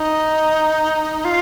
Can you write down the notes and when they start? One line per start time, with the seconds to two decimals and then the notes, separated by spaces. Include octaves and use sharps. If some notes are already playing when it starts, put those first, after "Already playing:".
Already playing: D#4
1.25 F4